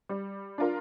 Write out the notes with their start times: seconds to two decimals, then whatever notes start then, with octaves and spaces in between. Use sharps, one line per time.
0.09 G3
0.58 D4 F4 A#4